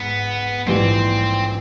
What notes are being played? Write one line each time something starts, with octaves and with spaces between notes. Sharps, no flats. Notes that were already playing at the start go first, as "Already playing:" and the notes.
Already playing: G#2 B3
A#1 G#2 E3 G3 C4